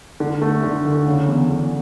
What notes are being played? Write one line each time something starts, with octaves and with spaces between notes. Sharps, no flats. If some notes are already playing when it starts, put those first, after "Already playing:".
D3
A3
D3
D2
C#3
E2
E2